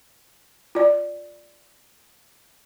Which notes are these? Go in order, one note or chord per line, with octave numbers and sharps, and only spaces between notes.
F4 D5